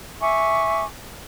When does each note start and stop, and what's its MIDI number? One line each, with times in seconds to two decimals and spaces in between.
0.21 0.84 76
0.21 0.84 80
0.21 0.84 85
0.21 0.84 86